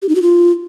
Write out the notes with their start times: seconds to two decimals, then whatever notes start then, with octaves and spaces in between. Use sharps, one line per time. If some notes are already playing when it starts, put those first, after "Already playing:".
0.02 G4
0.09 D#4
0.15 F#4
0.22 F4